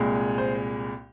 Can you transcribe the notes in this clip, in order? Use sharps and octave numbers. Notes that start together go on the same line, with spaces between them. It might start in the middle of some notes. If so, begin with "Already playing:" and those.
Already playing: C2 A#2 G#3
C5